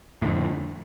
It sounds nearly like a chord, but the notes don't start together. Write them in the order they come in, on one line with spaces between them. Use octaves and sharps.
A2 D3 F2